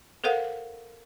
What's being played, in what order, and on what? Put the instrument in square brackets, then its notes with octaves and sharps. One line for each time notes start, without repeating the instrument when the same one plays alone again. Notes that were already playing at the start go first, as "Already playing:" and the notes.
[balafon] A4 A#4 C5 F5 F#5